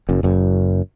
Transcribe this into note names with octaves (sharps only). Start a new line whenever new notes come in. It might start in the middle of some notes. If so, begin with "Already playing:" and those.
F#1 F#2
F#1 F#2